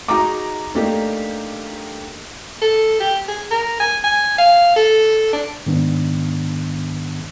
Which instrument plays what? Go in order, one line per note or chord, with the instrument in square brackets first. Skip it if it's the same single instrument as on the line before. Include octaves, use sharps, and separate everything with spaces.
[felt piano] D#4 F#4 G#4 D#5 A#5 D6
A3 A#3 D4 D#4 G4
[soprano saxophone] A4
G4
G#4
A#4
G#5
G#5
F5
A4
D4
[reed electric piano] G#2 D#3 B3 D4